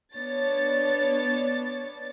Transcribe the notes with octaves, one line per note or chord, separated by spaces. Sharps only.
B3 D4 C#5 A6